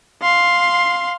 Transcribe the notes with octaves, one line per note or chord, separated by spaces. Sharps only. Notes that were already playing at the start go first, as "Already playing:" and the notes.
F5 C6